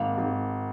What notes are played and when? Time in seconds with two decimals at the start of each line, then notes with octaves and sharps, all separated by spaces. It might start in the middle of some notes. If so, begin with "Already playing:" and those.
Already playing: G#1 A#3
0.18 G#1